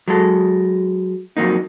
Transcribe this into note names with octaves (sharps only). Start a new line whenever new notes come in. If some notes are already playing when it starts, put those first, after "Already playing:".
F#3 G#3 A4
F2 F#3 A#3 D#4